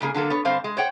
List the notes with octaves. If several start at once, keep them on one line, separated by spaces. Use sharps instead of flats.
G#2 C#3 A#3 G#4
D3 F#3 A#3 A4
B3 C#5
G2 D3 C4 C5 F5
G#3
C5 C#5 F#5 G5